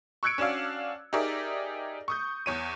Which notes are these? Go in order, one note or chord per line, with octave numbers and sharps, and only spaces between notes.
C#6 E6 F#6 G#6 C#7 D7
C#4 D4 F#4 D5 F5
D#4 G4 G#4 A#4 D5 E5
C#6 D#6 G6
E2 C#5 D#7